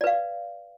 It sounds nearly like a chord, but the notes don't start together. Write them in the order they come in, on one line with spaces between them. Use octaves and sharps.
D5 B4 F5